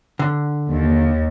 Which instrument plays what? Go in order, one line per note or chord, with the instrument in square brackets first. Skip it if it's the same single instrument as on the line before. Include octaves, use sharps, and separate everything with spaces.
[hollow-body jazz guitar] D3
[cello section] D#2